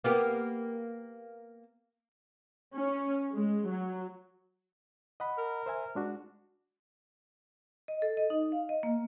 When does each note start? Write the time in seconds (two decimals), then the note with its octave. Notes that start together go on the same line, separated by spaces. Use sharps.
0.04 A#3 B3 G4
2.76 C#4
3.33 G#3
3.68 F#3
5.20 D#5 F#5 B5
5.38 A#4
5.66 C5 E5 G#5
5.95 G#3 D4 F#4
7.88 D#5
8.02 A4
8.17 D#5
8.30 D#4
8.52 F5
8.69 D#5
8.83 A#3